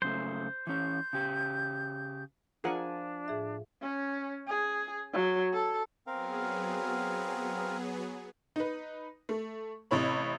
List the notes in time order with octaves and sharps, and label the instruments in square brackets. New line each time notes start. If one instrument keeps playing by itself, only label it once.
[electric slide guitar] F#2 C#3 A3 [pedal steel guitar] C5
[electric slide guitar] E3 C#4 [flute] G6
[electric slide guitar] C#3 G4
[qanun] F3 D5 G#5 [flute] D4 [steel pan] G#4 A#4 F#5
[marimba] A2 G#4 E5
[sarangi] C#4
G#4
F#3
A4
[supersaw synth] F#3 B3 G#4 [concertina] C4 A#4 F5
[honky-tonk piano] D#4 B4
A3
A1 C3 E4 C#5 B5